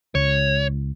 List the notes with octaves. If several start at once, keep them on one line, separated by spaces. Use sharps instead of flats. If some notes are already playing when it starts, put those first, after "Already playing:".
C#2 C#5